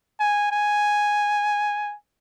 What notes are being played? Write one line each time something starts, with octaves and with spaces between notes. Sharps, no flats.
G#5
G#5